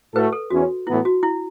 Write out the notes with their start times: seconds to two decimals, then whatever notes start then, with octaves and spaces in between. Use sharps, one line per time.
0.15 A2 A3 F#4 A4 B4
0.32 A4
0.50 E2 E3 C#4 F#4
0.87 A2 E3 B3 E4
1.05 F#4
1.23 E4